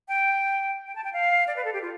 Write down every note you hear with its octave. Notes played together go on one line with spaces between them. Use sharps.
G5
G5
A5
G5
F5
D5
B4
A4
G4
F4